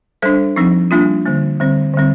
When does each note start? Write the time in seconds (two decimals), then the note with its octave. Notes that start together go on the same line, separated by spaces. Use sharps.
0.22 G3 D4 A4 C5
0.56 F3 C4 D#4
0.91 G3 A#3 D4 F4
1.26 D3 G3 A#3
1.60 D3 G3 C4
1.94 D3 G3 C4